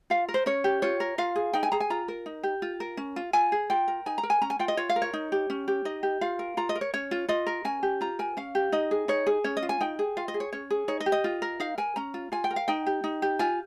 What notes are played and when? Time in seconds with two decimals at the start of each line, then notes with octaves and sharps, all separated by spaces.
0.10 F4 F5
0.29 A#4
0.34 C5
0.46 C#4 C#5
0.64 G4
0.82 F4 C#5
1.00 A#4
1.18 F4 F5
1.36 G#4
1.53 D#4 G5
1.63 G#5
1.72 G#4 A#5
1.80 G#5
1.90 F4 A#5
2.08 A#4
2.26 D#4
2.43 G4
2.62 F4
2.80 A#4
2.97 C#4
3.16 F4
3.33 F4 G#5
3.52 G#4
3.70 F4 G5
3.88 A#4
4.06 D#4 G#5
4.18 A#5
4.23 A#4
4.30 G#5
4.42 C#4 A#5
4.50 G#5
4.59 F4 G5
4.68 D#5
4.77 F4 C#5
4.89 F5
4.96 A#4
5.02 C#5
5.13 D#4
5.32 G4
5.50 C#4
5.68 G4
5.85 D#4 D#5
6.03 G4
6.21 F4 F5
6.39 A#4
6.57 F4 A#5
6.69 D#5
6.75 A#4
6.81 C#5
6.94 C#4 C#5
7.11 F4
7.28 F4 D#5
7.47 A#4
7.65 C#4 G#5
7.83 G4
8.01 F4 A#5
8.19 A#4 G#5
8.37 C#4 F5
8.55 G4
8.72 D#4 D#5
8.91 G#4
9.08 D#4 C#5
9.27 G#4
9.44 C#4 C#5
9.57 D#5
9.63 F4
9.69 G#5
9.81 D#4 G5
9.99 G#4
10.17 F4 F5
10.28 D#5
10.34 G#4
10.40 C#5
10.53 C#4 C#5
10.70 G#4
10.88 D#4 C#5
11.00 D#5
11.06 G4
11.12 D#5
11.24 F4
11.42 A#4
11.60 D#4 F5
11.78 A#4 G#5
11.96 C#4 A#5
12.14 F4
12.32 F4 G#5
12.44 G5
12.51 A#4
12.56 F5
12.68 D#4 G5
12.86 G4
13.04 D#4
13.22 G4
13.39 F4 G#5